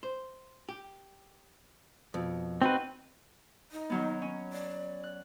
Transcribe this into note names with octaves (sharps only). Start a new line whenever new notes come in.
C5
G4
F2 B2
C4 D#4 F#4 B4
D#4
D#3 F#3 B3
C#4
D5
F#6